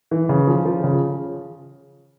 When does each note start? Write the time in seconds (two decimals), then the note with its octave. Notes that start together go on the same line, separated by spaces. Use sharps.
0.11 E3
0.29 C#3
0.47 F3
0.65 F3
0.84 C#3